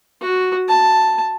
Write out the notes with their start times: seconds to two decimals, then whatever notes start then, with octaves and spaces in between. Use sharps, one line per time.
0.21 F#4
0.68 A5